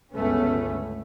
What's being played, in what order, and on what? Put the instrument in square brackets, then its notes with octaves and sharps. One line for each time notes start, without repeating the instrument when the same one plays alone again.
[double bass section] G1 C#2 A3 B3 C#4